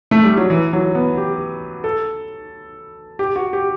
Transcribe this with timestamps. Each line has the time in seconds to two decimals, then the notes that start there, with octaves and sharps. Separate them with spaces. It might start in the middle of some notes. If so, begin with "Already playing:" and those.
0.11 A3
0.23 G3
0.37 F#3
0.50 E3
0.73 F#3
0.95 B3
1.17 G4
1.84 A4
3.19 G4
3.36 F#4
3.53 G4